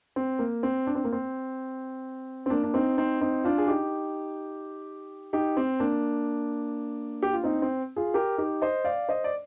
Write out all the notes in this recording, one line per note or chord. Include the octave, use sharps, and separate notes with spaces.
C4
A#3
C4
D4
C4
A#3
C4
C4
A#3 D4
D4
C4 D#4
C4 D#4
C4 D#4
D4 F4
G#4
D#4 G4
D#4 G4
C4
A#3 D4
G4
F4
C4 D#4
C4
F4 G#4
G4 A#4
D#4 G4
C5 D#5
D5 F5
C5 D#5
D5